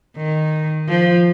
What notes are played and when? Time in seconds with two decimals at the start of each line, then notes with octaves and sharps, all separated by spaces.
0.17 D#3
0.88 F3